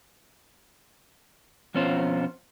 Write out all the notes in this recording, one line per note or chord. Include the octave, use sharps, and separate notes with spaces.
F2 B2 C#4 F4 C5